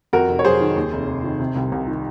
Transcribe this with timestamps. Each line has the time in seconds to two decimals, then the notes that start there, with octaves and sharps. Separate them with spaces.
0.13 F2 F#4 A#4
0.28 F1
0.39 C#5
0.45 F#3 G#4 C5
0.60 D#3
0.76 D#2
0.93 F1
1.08 F1
1.24 D#3
1.40 C3
1.55 C2
1.72 C2
1.87 D#3